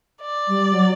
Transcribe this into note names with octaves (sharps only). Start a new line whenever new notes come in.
D5
G3
F#3